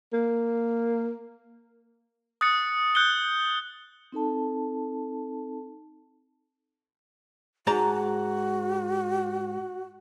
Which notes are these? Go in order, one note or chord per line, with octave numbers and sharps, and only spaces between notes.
A#3
D#6 F#6 A6 C#7
F#6 G6 C#7 G7
C4 D#4 A4 A5
G#2 F#4 A5 A#5